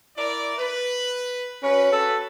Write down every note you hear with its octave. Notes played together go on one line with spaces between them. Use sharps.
E4 A#4 D5
B4
C#4 F#4 B4
A4